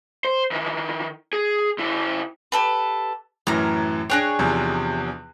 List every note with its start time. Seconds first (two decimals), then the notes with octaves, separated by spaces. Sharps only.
0.25 C5
0.51 D#3 E3
1.33 G#4
1.78 C#3 E4
2.52 G4 A4 B4
3.47 F#2 A2 E3 A#5 F6
4.10 D4 G#4 C#5 G5 F#6 A#6
4.39 E2 C3 F3